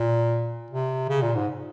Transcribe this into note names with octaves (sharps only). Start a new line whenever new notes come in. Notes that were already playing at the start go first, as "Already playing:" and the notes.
Already playing: A#2
C3
C#3
A#2
G#2